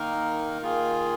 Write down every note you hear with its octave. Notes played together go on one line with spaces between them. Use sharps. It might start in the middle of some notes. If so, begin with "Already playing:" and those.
Already playing: D#3 A#3 D#4 A#4
D#3 A#3 F4 G#4